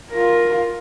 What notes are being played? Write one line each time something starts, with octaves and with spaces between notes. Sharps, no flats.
F4 A#4